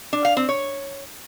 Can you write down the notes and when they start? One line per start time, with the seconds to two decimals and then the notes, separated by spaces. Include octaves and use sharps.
0.13 D4
0.25 F5
0.37 C4
0.49 C#5